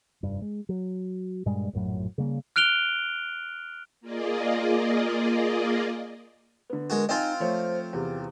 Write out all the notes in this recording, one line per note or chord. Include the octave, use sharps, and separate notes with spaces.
F1 G2
G#3
F#3
G2 A#2 G3 G#3
A#1 F#2 A2 F#3
C#3 G3 A#3
F6 F#6 D7 F7 G7
A#3 F4 G#4 D5 D#5
D3 B3
G#3 F#4 A#4
C4 D#4 F4 D#5 G#5
F3 A3 C5 C#5
E2 C3 G4